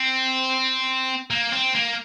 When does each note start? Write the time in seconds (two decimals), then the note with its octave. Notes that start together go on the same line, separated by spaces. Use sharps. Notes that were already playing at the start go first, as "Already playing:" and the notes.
Already playing: C4
1.31 A#3
1.53 C4
1.75 A#3